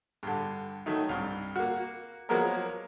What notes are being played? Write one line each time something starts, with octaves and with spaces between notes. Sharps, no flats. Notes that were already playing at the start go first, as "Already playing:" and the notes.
G2 D3
D#3 F#3 A3 D#4
C2 G2
A#3 F#4
F3 F#3 G#3 A#3 B3 A#4